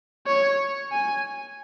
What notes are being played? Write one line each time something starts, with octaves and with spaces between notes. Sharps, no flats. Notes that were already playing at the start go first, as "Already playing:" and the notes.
C#5
G#5